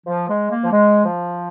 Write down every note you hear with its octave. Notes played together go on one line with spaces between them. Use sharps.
F3
G#3
A#3
F3
G#3
F3